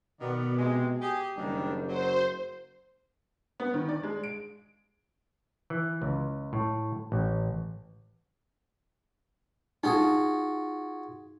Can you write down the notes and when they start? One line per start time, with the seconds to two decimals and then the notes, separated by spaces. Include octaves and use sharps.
0.21 B2 D#3 B3 D5
0.58 C3 G#3
1.00 G4 G#4
1.37 F#1 D#3 G3 D4
1.88 F#3 F#4 C5
3.60 B3
3.74 D#3
3.89 D5
4.03 G#3
4.24 D7
5.70 E3
6.02 C#2
6.53 A2
7.12 A1
9.83 D#4 F4 F#4 G#4